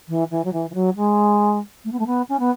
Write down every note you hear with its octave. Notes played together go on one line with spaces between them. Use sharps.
E3
E3
F#3
E3
E3
F#3
G#3
A3
B3
A3
B3
C#4
B3